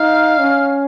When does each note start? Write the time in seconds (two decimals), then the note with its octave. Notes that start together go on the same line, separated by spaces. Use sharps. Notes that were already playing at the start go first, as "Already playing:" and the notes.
Already playing: D#4 F5
0.40 C#4